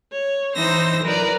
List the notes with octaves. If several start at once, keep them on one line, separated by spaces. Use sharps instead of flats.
C#5
E3 D#4 C5 E6 A#6
F#3 A#4 B4 D5